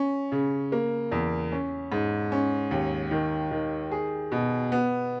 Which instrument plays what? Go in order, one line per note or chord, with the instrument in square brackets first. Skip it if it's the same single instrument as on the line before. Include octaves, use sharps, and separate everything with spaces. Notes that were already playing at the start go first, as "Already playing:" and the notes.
Already playing: [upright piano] C#4
C#3
A#3
E2
C#4
G#2
C#4
D#2
D#3
D#3
G#4
B2
B3